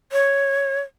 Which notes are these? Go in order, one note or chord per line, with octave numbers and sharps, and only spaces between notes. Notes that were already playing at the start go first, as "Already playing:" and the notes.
C#5